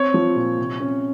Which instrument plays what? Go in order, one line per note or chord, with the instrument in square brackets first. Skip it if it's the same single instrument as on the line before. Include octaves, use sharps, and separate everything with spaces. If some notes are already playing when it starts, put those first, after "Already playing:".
Already playing: [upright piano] C4 [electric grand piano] C#5
[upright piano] F3
A#2
C3
C#4